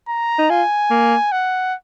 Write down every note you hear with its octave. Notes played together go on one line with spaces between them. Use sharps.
A#5
D#4
F4 G#5
A#3
F#5